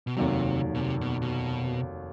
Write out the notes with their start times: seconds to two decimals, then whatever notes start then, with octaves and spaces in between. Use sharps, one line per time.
0.07 B2
0.16 F1 D#2 C3 D#3 F#3
0.75 B2
0.80 C3
1.01 B2
1.22 B2